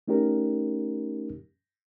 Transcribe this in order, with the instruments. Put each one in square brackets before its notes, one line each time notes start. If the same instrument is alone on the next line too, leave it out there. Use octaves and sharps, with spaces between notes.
[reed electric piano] A3 C#4 D#4 G4 A#4